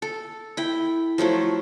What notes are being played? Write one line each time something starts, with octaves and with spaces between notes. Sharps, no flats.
A4
E4 G5
F3 F#3 A3 E4